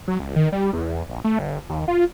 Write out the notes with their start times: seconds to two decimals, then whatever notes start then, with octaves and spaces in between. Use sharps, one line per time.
0.08 F#3
0.19 C#2
0.36 D#3
0.52 G3
0.73 E2
1.10 A#1
1.24 A3
1.39 G1
1.69 D#2
1.88 F4